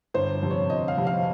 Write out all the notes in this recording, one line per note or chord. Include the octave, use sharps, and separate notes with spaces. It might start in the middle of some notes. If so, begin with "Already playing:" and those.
G1 C5
F2 C3
C#5
G1 D#5
F5
F2 C3
F5